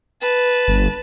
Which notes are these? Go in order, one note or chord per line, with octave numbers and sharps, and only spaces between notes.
B4 A5
G1